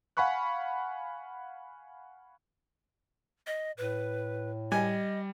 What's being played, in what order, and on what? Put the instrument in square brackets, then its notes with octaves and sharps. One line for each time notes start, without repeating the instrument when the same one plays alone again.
[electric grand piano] F5 F#5 G#5 B5 C#6 F#6
[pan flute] D#5
[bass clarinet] A2 [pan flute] B4
[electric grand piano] G3 [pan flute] D#5 [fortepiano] G#5